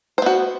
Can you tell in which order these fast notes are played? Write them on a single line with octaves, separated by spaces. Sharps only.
C5 B3 F#4